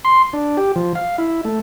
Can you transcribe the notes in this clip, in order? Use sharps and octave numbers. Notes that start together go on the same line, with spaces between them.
C6
D4
G4
F3
F5
E4
A3